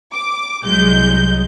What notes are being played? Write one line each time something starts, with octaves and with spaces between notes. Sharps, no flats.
D6
C2 F#3 G#3 G6